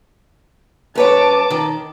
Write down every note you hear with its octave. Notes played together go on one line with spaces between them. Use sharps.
F#2 B4 C#5 A5 D6
D#3